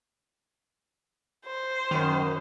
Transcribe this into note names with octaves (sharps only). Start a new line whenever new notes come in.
C5
F#2 D#3